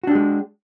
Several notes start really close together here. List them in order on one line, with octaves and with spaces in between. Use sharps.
F#4 D4 G4 G#3